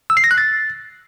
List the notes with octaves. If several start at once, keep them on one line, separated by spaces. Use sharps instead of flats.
E6
C7
A#6
F#6
A6